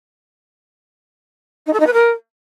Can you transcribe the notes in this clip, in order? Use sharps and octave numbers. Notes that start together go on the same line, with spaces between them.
D#4
A4
D#4
B4
A#4